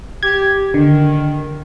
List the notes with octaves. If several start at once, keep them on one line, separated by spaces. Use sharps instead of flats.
G4 G#6
D3 D#3